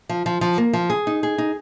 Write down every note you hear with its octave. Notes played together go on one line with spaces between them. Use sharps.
F3
F3
F3
A#3
F3
G#4
D#4
G#4
D#4